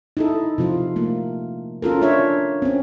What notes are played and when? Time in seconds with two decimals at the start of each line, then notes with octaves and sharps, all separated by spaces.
0.17 D#4 E4 A4
0.58 C3 F3 F4
0.96 A3 A#3
1.82 C#4 F4 A4 A#4
2.01 D4 F4 C#5 E5
2.62 C4 C#4